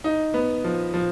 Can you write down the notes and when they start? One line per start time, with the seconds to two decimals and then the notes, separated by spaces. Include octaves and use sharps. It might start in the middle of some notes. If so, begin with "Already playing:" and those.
0.04 D#4
0.34 B3
0.64 F3
0.94 F3